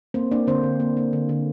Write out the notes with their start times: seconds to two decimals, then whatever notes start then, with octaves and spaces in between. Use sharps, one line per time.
0.14 A#3 C4 C5
0.31 A#3 D4 D5
0.47 D3 C4 C5
0.63 D3
0.80 A#3
0.97 A#3
1.13 D3
1.29 D3